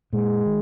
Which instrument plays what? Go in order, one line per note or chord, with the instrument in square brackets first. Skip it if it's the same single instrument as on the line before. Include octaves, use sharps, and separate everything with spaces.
[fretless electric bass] A#2 [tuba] G#3
[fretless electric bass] D#3